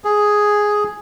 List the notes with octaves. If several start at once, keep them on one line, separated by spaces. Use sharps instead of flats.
G#4